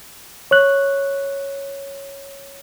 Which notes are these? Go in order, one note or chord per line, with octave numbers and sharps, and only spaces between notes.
C#5 F#6